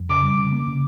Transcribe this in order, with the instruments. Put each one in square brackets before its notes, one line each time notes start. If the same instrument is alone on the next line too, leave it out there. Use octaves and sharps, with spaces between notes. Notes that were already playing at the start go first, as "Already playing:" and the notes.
Already playing: [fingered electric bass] F2
[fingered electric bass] C#3 [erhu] D6
[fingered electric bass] G3
C#3
A#3
C#3